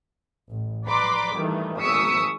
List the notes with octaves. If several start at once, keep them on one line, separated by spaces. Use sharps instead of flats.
A1
B4 D5 A#5 C6 D6 B6
G2 D#3 E3 A3
G#1 C#6 D#6 E6 B6 C#7